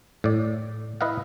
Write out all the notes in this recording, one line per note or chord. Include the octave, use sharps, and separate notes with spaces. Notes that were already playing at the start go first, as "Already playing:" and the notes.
A2 D5
E4 B4 D#5 F5 F#5